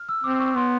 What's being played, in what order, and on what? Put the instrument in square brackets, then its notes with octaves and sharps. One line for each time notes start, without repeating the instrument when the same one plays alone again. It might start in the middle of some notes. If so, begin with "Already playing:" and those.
Already playing: [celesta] F6
E6
[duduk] C4 [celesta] D6
[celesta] C#6
[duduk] B3 [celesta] C6